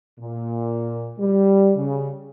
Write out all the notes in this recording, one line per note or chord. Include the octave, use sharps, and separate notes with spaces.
A#2
G3
C#3